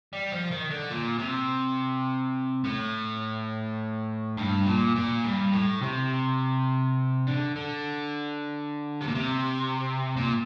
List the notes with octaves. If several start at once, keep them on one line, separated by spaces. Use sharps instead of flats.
G3
F3
D#3
D3
A#2
C3
A2
G2
A#2
A#2
G2
A2
C3
D3
D3
C3
A#2
C3
A#2